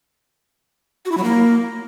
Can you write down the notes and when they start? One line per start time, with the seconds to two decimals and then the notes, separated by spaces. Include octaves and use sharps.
1.06 F#4
1.12 E4
1.18 F#3
1.24 A#3